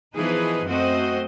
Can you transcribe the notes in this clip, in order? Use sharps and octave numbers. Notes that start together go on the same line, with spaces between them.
E3 F3 B3 D#4 G#4 B4
F#2 A3 C4 F#4 C5 D#5